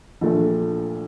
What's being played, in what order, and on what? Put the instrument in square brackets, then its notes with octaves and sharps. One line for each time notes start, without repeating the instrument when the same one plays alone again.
[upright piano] A#1 A#2 A3 D4 A4